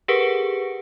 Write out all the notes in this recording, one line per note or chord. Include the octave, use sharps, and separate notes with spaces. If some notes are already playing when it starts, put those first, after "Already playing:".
G4 G#4 A#4 B4 F#5 C#6